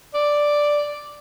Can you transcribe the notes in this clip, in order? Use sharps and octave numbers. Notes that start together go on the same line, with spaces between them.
D5